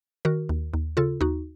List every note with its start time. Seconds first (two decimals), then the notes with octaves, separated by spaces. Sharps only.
0.25 D#3 F#4 A#4
0.49 D#2
0.74 D#2
0.97 C#3 F4 A4
1.21 D#2 D#4 F#4